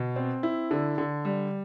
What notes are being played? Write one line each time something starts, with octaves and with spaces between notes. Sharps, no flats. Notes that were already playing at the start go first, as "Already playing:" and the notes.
Already playing: B2
C4
E4
D3
D3
G3